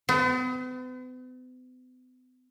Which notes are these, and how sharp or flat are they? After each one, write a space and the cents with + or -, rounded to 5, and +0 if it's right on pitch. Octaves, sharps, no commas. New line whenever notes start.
B3 +45